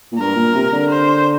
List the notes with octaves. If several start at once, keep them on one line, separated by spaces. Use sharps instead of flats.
A#2
G2 A#4
A#2
C3
D3
C5